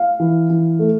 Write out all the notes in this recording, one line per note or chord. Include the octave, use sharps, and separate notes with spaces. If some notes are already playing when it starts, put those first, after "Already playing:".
Already playing: F5
E3
E3
A3